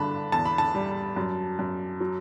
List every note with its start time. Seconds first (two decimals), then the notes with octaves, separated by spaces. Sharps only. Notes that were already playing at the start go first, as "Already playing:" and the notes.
Already playing: G2 D3 A5 B5
0.32 E2 A5
0.46 B5
0.58 A5
0.75 G3
1.16 F#2
1.59 F#2
2.01 F#3